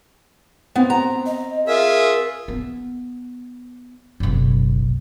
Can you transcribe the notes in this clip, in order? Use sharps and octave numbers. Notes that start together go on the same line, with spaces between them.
B3 C4
A#5
D#5
F4 G#4 A#4 E5
B3
F#1 B1